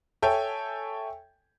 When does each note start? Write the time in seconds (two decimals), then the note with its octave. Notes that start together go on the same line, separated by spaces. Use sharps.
0.22 A4 C#5 E5 G5 G#5